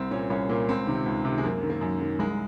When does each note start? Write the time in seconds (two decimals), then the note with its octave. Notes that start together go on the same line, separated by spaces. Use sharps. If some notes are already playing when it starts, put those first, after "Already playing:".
Already playing: C2 C4
0.11 A#2 C#4
0.30 C2 C#4
0.49 A#2 A#3
0.69 C#2 C4
0.87 C3 D#3
1.06 C#2
1.25 C3 D#3
1.38 G#3
1.43 F#2 A#3
1.63 D#3
1.69 A#3
1.81 F#2
2.01 D#3
2.19 C2 G#3